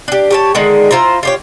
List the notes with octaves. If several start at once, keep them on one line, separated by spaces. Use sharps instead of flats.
D4 G4
G4 C#5 A5
D3 D#3 G#3
E4 F4 C5 A#5
F4 G4 C#5